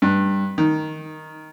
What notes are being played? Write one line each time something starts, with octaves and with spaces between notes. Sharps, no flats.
G2
D#3